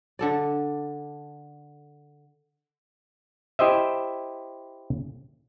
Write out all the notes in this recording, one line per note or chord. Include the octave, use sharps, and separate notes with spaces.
D3 A4 D5
E4 G4 C5 D#5 E5